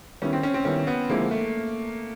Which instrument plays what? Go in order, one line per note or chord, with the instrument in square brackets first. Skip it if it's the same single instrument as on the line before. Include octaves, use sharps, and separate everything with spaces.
[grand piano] D#3 G3 B3 E4 [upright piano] C#4
[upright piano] C4
C#4
C4
[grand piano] D#3 G3 B3 E4 [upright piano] C#4
[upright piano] B3
[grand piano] D3 F3 G#3 C4 E4 [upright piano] A#3
[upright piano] A3